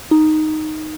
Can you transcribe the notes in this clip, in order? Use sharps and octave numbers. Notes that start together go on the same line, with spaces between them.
D#4